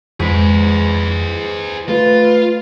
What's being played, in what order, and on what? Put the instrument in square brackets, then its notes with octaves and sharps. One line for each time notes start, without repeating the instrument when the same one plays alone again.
[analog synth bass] F2 [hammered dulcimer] G#2 [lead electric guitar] G#4 B4
[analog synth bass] A3 [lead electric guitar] F4 [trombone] B4